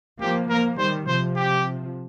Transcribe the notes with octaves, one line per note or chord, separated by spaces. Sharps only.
F3 A#3 G4
F3 A#3 A#4
D#3 G3 C5
C3 F3 C5
G4